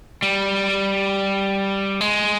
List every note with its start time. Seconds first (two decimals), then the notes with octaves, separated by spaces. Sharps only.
0.22 G3
2.01 G#3